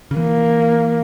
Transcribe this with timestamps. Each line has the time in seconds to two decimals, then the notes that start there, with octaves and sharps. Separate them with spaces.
0.11 C#3
0.16 E3 A#3